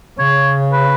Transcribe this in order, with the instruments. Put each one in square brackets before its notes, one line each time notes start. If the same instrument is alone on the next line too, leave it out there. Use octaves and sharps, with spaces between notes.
[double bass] C#3 [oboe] C#5
[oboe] B4